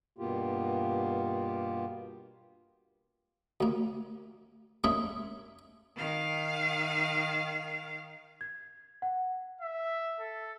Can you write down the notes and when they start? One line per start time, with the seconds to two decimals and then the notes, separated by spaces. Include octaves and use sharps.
0.18 G2 B2 A#3 B3 F4 G4
3.61 D2 A#3
4.84 G#3 A#3 C#4 D4 G#4 E5
5.96 D#3 F5
8.41 G#6
9.02 F#5
9.61 E5
10.20 A4